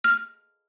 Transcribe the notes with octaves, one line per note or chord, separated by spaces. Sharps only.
F6